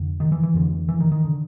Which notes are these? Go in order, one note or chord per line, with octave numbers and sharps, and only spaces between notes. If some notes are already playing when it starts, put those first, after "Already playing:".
Already playing: F2 D3
D#3
E3
E3
F2 D3
E3
D#3
D#3
D3